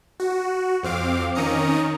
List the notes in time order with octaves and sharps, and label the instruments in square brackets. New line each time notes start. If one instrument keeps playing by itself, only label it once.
[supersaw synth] F#4
F2 C4 F5 D6
D#3 C#4 A#5 D#6 C#7